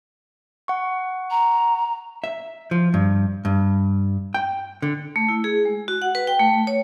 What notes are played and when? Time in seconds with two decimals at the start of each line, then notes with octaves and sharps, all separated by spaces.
0.68 F#5 C#6
1.31 A#5
2.24 E5
2.71 F3
2.94 G2
3.45 G2
4.34 G5
4.82 D3
5.16 A3
5.29 E4
5.44 G#4
5.65 G#3
5.88 F#4
6.02 F#5
6.15 B4
6.27 G5
6.40 A3
6.67 C#5